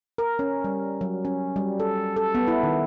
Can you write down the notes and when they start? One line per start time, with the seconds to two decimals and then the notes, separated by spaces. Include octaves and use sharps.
0.18 A#4
0.39 C#4
0.64 G3
1.01 F#3
1.25 C#4
1.56 G3
1.80 A4
2.16 A4
2.35 B3
2.48 E4
2.63 D#3